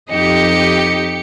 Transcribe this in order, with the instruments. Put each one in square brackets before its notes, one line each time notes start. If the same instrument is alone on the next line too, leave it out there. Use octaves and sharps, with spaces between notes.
[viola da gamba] F2 D#4 D#5 [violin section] G4 C#7